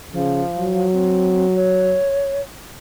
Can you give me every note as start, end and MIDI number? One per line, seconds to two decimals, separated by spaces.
0.13 0.42 49
0.13 0.88 53
0.56 1.97 54
0.92 1.47 60
1.56 2.41 73